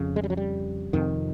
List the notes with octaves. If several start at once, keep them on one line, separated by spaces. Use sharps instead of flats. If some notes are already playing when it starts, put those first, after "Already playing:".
Already playing: F2 C#3
G#3
G3
F#3
G3
F2 C3 D#3